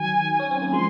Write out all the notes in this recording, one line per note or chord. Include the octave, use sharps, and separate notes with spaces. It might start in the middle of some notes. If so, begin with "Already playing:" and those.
Already playing: D#3 F#3 G#5
C#4
C4
A#3
F3 G#3 C6